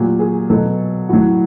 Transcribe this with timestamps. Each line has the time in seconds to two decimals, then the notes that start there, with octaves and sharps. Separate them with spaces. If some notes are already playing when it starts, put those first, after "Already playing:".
Already playing: A#2 F#3 G4
0.19 G#4
0.50 B2 F#3 A4
1.09 A2 F#3 F#4